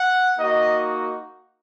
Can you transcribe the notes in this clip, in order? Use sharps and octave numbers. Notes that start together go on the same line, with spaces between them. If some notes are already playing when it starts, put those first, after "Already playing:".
Already playing: F#5
A#3 D#4 F#4 D#5